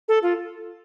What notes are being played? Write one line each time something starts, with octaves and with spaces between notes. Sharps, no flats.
A4
F4